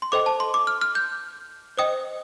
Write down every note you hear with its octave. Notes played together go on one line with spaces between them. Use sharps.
C6
A4 C5 D#5 G5 D6
A5
C6
D6
F6
F6
G6
C5 D#5 G5 D#6